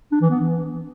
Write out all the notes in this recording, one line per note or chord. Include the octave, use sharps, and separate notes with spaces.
D4
E3
B3
E3